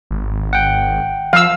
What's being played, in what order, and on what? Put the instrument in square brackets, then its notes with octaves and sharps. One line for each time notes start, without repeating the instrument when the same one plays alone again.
[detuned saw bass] G#1
[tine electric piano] F#5 G5
[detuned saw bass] F3 [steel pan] F5 E6